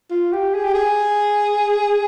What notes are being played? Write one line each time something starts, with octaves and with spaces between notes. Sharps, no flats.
F4
G4
G#4
G4
G#4